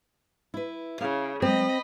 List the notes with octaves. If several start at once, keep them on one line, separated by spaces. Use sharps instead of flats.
E4 B4
C#3 E4 F5
F#3 G#3 C4 D#5 B5